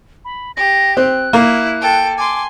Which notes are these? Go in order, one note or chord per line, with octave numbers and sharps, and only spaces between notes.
B5
G4 A#6
C4 F#6
A#3 E4
A4 G5
G#5 C6 D6